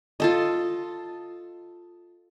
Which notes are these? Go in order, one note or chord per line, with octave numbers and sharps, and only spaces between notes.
F4 A4 D#5